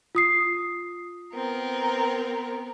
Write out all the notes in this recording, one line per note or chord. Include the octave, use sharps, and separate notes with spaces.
F4 D#6 C7
B3 C4 A#4